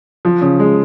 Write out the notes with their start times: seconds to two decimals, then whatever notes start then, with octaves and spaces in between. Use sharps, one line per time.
0.25 F3
0.41 C#3
0.60 G#3